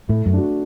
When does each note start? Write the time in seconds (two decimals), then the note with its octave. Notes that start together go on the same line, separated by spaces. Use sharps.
0.09 A2 A3
0.26 F#2
0.33 D4 F#4